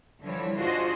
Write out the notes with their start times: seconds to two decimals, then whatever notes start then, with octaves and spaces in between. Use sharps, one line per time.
0.23 D3 E3 F3 G3 C#5
0.58 D4 F4 F#4 G#4 C5 D#5